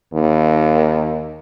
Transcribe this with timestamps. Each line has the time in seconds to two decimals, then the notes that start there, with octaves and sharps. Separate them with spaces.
0.13 D#2